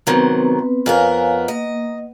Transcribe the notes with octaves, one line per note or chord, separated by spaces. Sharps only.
C3 D#3 F#3 B3 C4 B4
F2 B3 A#4 C#5 F5 G#5
A#3 D#5